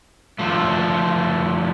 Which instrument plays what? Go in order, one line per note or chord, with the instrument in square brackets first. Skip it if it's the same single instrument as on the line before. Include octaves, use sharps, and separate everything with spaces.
[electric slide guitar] D3 F3 A3